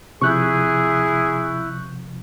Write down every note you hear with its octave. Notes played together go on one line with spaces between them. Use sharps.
C3 F3 E4 G#4 C#6 F#6 G6